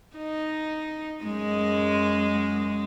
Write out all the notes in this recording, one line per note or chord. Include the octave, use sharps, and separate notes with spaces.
D#4
F#2 G#3